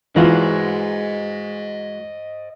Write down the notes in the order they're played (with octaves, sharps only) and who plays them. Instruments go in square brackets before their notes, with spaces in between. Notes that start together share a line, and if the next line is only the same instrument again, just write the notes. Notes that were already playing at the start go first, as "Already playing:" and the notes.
[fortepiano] E3 F4 [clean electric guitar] G#3 F#4 [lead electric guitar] C5 D#5